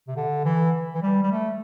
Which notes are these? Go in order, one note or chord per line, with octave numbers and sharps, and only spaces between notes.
C3
D3
E3
E3
G3
G3
A3